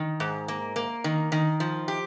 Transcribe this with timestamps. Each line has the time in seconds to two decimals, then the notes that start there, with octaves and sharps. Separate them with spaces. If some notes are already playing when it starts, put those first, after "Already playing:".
Already playing: D#3
0.20 G#2
0.48 A#3
0.76 A#3
1.04 D#3
1.32 D#3
1.60 F3
1.88 G4